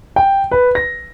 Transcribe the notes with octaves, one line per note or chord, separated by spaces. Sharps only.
G5
B4
A#6